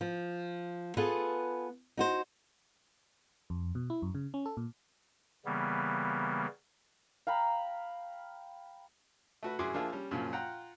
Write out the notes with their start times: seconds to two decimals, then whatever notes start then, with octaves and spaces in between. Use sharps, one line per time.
0.01 F3
0.97 B3 F4 G#4 A4 B4
1.97 D#4 F#4 C5
3.50 F2
3.75 B2
3.90 E4
4.02 F#2
4.15 C#3
4.34 C#4
4.46 A4
4.57 A#2
5.45 C#3 E3 G3 A#3 B3
7.27 F5 G5 A#5 B5
9.43 A3 F#4 B4
9.59 F#2 E4 F#4 G#4 C6 D6
9.74 F3 A#3 D4 F4 G#4 E5
9.92 G3 C#4
10.11 F#2 A#2 C#3 F3
10.33 F4 F#5 G5 A#5